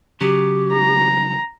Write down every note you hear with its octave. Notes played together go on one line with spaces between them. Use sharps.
C#3 F#3 G4
A#5